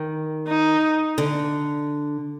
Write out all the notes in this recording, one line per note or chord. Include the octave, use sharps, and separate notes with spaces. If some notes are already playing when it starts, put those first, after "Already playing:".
Already playing: D#3
D#4
D3